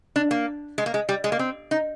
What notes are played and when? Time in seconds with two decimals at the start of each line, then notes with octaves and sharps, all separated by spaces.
0.16 D4
0.31 A#3
0.78 G#3
0.86 A#3
0.94 G#3
1.09 G3
1.24 G#3
1.32 A#3
1.39 C4
1.71 D#4